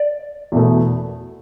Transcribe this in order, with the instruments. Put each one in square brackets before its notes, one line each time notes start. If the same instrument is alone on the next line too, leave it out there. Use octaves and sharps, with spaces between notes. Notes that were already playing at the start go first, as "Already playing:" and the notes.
Already playing: [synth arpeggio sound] D5
[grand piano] E2 B2 A3